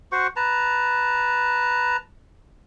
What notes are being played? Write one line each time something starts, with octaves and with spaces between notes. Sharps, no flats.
F#4 C5 C#6
B4 A5 A#5